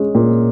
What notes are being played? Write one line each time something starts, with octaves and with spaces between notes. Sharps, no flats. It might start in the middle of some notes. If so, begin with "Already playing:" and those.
Already playing: G#3 C#4
A#2